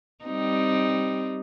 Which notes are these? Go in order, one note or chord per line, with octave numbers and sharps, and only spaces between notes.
G3 C4 D#4